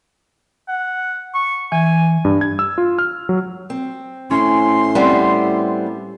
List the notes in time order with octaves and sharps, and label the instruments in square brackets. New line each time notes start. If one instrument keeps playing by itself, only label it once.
[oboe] F#5
C#6
[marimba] E3 [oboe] G#5
[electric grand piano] G2
G#6
E6
F4
F6
F#3
[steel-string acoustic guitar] C4
[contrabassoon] A2 [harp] C#4 [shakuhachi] C6
[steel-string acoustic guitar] G3 B3 C4